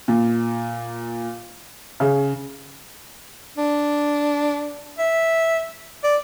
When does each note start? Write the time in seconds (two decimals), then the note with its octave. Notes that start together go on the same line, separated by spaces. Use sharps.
0.08 A#2
2.00 C#3
3.58 D4
4.98 E5
6.04 D5